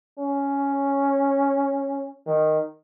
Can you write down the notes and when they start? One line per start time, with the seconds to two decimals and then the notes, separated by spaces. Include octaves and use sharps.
0.19 C#4
2.27 D#3